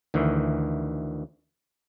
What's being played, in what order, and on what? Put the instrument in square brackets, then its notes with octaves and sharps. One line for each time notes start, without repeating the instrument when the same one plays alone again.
[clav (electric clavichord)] D2 D#3 E3